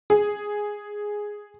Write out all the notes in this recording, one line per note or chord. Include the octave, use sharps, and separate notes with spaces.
G#4